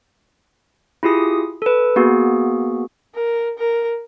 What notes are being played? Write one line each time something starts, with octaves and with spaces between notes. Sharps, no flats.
E4 F4 G4 G#4 D#6
A4 B4
A#3 B3 F#4 G#4
A#4
A#4